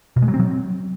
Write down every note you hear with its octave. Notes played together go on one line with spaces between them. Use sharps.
B2
G#3
F#3
C4
F#3